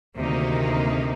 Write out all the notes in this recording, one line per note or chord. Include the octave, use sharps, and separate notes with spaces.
D2 C3 D#3 A#3 D#4